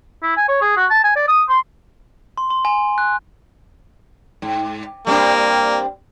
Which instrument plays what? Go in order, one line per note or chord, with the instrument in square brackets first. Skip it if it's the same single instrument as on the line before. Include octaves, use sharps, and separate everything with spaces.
[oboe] E4
G#5
C#5
G#4
F#4
A5
G#5
D5
D#6
C6
[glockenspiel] C6
C6
G#5
F#6
[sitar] G#2
[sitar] G3 C4 D4 [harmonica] A#3